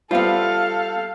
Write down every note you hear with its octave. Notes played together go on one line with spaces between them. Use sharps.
G3 B3 F4 A4 C5 E5 F5